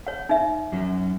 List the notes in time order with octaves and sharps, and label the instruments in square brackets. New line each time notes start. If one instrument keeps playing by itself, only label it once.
[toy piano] C#5 F#5
D#4 E5
[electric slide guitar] F#2 F#3 C#4